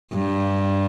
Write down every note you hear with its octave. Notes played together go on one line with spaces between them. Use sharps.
G2